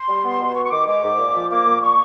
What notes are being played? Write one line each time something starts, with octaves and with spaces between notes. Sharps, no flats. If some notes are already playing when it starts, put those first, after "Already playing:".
Already playing: C6
G3
B3
B2
B3 C#6
C#6
D#3 D6
G#3 D6
G#2
A#2
F3
A#3 D6
A#2
C#6